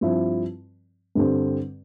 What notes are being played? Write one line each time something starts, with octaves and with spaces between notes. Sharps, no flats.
G2 F3 C4 E4
G2 D3 G3 C4